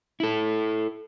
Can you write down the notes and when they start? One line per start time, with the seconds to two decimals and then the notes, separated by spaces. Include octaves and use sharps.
0.20 E4 A4